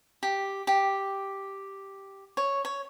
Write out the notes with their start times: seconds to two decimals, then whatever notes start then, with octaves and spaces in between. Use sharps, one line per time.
0.23 G4
0.67 G4
2.37 C#5
2.65 C#5